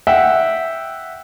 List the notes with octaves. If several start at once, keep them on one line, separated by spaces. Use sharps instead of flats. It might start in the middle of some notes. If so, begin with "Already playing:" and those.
E5 F#5 G5